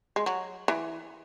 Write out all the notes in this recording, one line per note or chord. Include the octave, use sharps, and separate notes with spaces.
G#3
F#3
E3